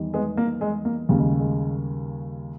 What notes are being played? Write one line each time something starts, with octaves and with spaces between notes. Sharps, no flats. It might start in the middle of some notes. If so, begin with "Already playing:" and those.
Already playing: E2 D#3 G3
G#3 B3
A#3
G#3
A#3
D#2 C#3 G3 A#3
G#3
G#3